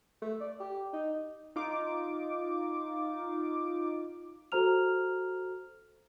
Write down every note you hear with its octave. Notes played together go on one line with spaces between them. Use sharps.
A3
D5
G4
D#4
D#4 F4 D6
F#4 A4 C5 A#5 F6 F7